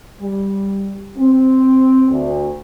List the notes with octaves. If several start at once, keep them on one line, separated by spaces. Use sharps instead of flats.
G3
C4
D2